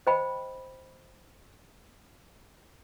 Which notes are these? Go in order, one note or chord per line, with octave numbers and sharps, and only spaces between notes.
C5 D#5 G5 B5